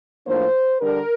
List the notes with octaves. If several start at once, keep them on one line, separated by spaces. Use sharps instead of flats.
A2 F3 A#3 D4 C5
D3 G3 D4 A#4